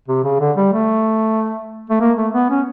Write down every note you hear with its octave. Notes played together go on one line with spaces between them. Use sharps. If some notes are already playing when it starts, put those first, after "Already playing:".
C3
C#3
D3
G3
A3
A3
A#3
A3
B3
C#4